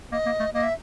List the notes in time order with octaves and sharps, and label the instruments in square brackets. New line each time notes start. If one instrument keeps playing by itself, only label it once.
[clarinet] A#3 [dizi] D#5
[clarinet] A#3
A3
[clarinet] A#3 [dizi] D#5
[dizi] E5